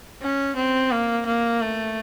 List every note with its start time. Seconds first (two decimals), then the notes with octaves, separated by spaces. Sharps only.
0.22 C#4
0.56 C4
0.91 A#3
1.26 A#3
1.61 A3